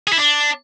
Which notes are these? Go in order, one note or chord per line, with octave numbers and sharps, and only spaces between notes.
G#4
E4
D4